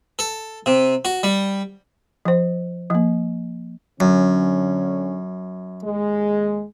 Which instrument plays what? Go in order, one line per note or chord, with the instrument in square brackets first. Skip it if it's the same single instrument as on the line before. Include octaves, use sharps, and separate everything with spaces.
[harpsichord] A4
C3
F#4
G3
[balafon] F3 C5
F3 A#3
[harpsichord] F#2 [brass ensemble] D3 C#4
[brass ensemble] D#2 G#3